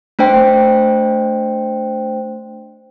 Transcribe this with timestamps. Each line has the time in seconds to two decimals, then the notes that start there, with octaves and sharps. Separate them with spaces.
0.19 A3 D4 C5 G5